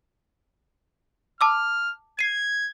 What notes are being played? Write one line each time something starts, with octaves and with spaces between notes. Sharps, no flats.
A5 D6 E6 F6
G#6 C7 D#7